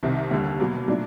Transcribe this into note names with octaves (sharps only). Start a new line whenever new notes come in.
C2 C3 D#3
D#2 D3 G3
B2 F#3 A#3
A#2 F#3 A3 D4